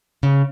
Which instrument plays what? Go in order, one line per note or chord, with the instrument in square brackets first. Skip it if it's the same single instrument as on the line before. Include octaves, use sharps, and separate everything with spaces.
[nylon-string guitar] C#3